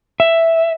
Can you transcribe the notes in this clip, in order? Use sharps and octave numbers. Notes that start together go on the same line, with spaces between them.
E5